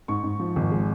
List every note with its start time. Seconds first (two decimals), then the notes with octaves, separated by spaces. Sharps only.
0.08 G#2 C#6
0.24 G#2
0.40 F3
0.56 G#1
0.71 G#3